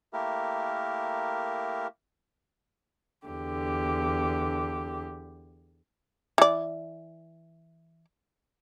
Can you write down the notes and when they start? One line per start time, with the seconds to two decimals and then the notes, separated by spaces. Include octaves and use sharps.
0.13 A3 A#3 E4 G4 A#4
3.27 E2 D3 G4
6.38 E3 D5